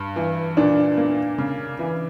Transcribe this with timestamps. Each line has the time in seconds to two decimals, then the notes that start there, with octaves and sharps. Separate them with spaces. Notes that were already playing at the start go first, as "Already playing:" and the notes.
Already playing: G2
0.16 E3
0.57 A#2 D4
0.97 A#3
1.38 C#3
1.79 E3